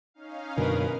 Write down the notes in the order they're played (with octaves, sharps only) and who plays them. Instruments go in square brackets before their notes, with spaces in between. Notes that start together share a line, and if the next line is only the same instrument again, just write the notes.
[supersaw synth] C#4 D#4 F5
[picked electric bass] F#2 B2 D3 [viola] A#4 B4